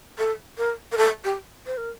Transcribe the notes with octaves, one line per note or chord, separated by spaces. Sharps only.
A4
A#4
A#4
A4
G4
C5
A#4